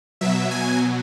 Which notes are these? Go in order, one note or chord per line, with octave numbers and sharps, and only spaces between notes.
B2 F#3 E5
G#5